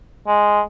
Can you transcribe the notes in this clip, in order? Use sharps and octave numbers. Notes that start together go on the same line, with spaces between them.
G#3